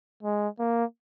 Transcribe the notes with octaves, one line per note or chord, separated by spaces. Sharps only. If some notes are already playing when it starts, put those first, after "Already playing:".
G#3
A#3